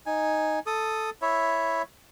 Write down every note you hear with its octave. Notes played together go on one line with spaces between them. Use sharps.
D#4 G#5
A4 D#6
E4 C#5 E5